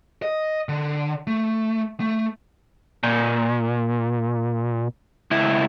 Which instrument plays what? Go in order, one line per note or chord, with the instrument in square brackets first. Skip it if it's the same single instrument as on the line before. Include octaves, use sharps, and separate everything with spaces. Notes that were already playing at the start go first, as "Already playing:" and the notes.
[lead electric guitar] D#5
D3
A3
A3
A#2
C#2 E4